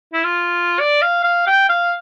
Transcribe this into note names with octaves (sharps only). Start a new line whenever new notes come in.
E4
F4
D5
F5
F5
G5
F5